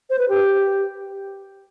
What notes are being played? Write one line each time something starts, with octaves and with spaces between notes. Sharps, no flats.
C5
B4
G4